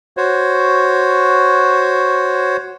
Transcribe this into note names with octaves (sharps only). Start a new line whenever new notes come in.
F#4 C5 C#5